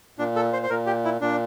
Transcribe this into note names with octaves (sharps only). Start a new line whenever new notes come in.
A#2 D4
A4
C5
C5
A#2 A#4
G4
E4
A#2 D4